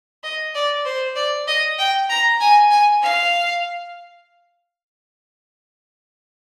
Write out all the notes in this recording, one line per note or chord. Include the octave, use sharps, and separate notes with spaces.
D#5
D5
C5
D5
D#5
G5
A#5
G#5
G#5
F5